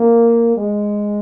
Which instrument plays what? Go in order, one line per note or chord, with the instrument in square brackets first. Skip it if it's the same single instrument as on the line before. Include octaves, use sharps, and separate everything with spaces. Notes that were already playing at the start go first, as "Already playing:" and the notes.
Already playing: [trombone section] A#3
G#3